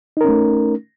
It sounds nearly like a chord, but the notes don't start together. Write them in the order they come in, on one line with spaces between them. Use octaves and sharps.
D#4 A#4 C#4 A3